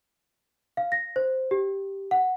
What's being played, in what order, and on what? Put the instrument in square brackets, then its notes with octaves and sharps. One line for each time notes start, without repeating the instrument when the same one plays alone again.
[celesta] F5
A#6
C5
G4
F#5